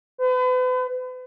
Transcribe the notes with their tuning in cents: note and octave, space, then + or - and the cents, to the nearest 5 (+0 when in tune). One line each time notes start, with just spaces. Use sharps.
B4 +40